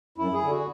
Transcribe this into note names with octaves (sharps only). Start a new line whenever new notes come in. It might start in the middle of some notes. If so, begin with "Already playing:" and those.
F#2 E4
G#4
D3
F#4